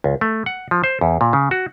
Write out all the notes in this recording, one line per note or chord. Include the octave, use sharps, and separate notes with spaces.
C#2
A3
F#5
F3
C5
E2
A#2
C#3
F#4